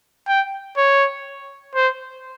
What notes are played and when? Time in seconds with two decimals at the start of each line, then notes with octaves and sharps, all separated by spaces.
0.28 G5
0.77 C#5
1.74 C5